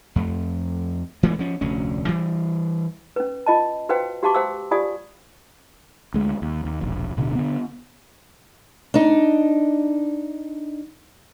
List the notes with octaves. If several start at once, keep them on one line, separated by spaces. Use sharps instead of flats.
F2 A3
E3 G#3 A3 B3
F3 C#4
F1 D2 C#4
E3 G3
C#4 B4
F4 D#5 A5
F#4 B4 C5 F5 G5
F#4 G4 F5 A5 C6 D6
C5 F5 G5 E6
F4 G4 D5 F5 G#5 D#6
D2 G#3
D#2
D#2
E1 A#1
D1 B2 D3
D3 B3
D4 D#4